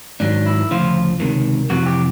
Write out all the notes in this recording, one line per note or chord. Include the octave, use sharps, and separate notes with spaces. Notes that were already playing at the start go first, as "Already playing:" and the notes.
G#2 D#3 F#3 D4
E4
D2 C#3 F3 F4
C#2 C3 D#3
F2 C3 E3 F#4
G4